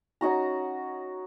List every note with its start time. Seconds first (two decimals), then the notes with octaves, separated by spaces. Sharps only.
0.21 C#4 D#4 F#4 A#5